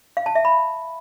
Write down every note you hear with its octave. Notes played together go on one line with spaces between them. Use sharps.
F5
A5
E5
B5